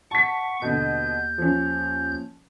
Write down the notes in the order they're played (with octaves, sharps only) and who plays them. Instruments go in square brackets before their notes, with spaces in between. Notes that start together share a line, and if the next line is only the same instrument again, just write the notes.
[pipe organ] F#5 C#6 [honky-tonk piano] A5 B6
[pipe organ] D#2 G6 [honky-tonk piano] B2 D3
[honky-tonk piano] F3 C#4